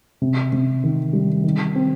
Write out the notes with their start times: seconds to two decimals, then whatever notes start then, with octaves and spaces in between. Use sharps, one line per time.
0.22 C3
0.52 C3
0.84 D#3
1.13 G3
1.44 D#3
1.75 C4